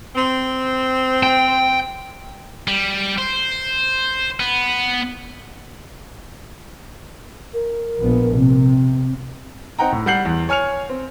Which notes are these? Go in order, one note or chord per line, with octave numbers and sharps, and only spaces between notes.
C4
G5
G3
C5
B3
A#4
A#1 B3
C3 C4
C4 D#4 F#5 G5 A#5
A2
G3 F#5 G6 C7 F#7
E2
C#5 G#5 F6 C#7 F7
C4